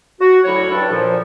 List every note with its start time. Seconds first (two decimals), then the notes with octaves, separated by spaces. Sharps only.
0.20 F#4
0.44 D2 F#3 E4 C#5
0.70 G2 D4 A4
0.92 A#2 F3